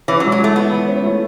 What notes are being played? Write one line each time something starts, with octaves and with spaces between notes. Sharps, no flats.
E3 C#4
F#3
G#3
F#3
E3 A3
E3 B3
E3
C#4
A3